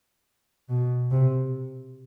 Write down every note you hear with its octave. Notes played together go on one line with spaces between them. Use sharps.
B2
C3